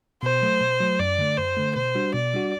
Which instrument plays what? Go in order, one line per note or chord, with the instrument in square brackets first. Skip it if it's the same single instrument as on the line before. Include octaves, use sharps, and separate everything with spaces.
[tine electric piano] B2 [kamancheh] C5
[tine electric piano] F#3 A3
B2
F#3 A3
[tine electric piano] F#2 [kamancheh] D5
[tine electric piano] D3 A3
[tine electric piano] F#2 [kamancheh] C5
[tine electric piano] D3 A3
[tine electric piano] B2 [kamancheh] C5
[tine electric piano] G3 D4 F#4
[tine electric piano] B2 [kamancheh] D5
[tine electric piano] G3 D4 F#4